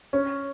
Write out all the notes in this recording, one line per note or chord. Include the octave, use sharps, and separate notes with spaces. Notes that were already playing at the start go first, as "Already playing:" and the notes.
C#4